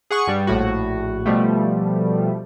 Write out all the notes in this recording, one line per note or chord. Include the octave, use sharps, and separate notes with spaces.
G#4 F#5 C#6
G2 G3
A#1 A2 F#4
B2 F3 G3 A3